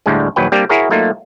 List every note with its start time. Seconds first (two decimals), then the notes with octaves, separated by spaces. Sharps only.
0.06 D2 A2 D3 G3 G#3
0.36 A#1 D#2 F#3 B4 G5
0.52 G3 A#3 C4 D4 G4
0.69 E4 F#4 G#4 A#4 C#5
0.90 F#3 A3 A#3 D#4 F4